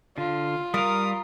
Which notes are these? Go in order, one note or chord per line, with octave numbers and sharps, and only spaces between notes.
D3 F4
G3 A#4 F5 D#6